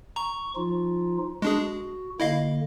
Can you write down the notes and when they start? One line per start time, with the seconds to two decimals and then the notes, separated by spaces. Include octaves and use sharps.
0.16 A#5 C#6
0.56 F3 D#4 F4
1.42 G#3 D4 F#4 G#4
2.20 D3 A#3 E4 D#5 F5